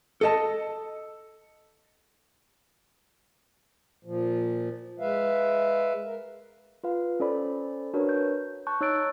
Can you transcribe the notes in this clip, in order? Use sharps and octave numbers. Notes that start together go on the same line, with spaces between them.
A4 D#5 A5
A#2 F3
G#3 B4 E5 F5
A#4
F4 B4 F5
C#4 A4 C5 D5 B5
D4 F#4 A#4 B4 C#5
G6
A5 C#6 F#6 G6
D#4 C#5 E6 F#6 A6 D7